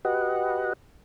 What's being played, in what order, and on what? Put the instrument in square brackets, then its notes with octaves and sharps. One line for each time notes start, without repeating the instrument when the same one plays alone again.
[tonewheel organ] F#4 G4 B4 D#5 F#5